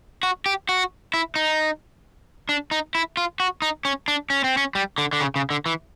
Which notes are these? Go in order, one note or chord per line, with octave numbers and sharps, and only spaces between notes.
F#4
G4
F#4
E4
D#4
D4
D#4
E4
F4
F#4
D#4
C#4
D4
C#4
C4
C#4
G3
D3
D3
C#3
C#3
D3
E3